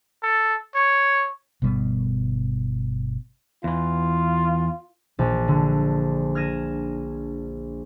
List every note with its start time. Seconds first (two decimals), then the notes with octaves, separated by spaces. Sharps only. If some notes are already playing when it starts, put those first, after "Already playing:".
0.23 A4
0.75 C#5
1.62 G1 B2 G3 B3
3.64 E2 E3 F4
5.19 A#1
5.48 D3
6.35 F6 G#6 A#6 D#7 E7